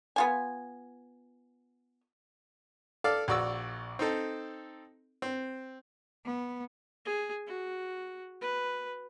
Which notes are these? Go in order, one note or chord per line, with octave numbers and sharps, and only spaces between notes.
B3 F4 G#5
A4 D5 F5
A#1 F#4 D5 D6 E6
C4 D#4 A4
C4
B3
G#4
F#4
B4